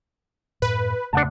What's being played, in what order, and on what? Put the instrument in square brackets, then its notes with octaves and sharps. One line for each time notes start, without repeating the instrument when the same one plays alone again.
[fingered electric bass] F#2 A2 [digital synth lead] B4
[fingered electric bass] E2 C#3 A3 [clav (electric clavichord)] D4 F#5 A5